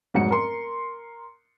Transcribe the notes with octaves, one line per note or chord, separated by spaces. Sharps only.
F1 G#2 F#3 F#5 C#7
A#4 C6